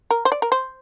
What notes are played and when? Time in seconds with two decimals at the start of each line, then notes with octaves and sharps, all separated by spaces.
0.11 A#4
0.25 C5
0.32 D5
0.42 A#4
0.52 C5